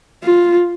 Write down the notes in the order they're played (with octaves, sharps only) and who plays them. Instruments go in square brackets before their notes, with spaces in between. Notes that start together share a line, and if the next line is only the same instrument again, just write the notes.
[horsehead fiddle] F4